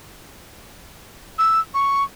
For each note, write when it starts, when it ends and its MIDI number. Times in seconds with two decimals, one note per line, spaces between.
1.39 1.60 88
1.74 2.04 85